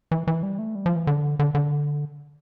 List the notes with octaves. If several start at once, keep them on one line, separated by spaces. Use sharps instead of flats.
E3
E3
G3
A3
G3
F3
E3
D3
D3
D3